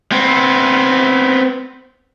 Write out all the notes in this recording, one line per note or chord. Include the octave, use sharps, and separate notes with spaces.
B3 C4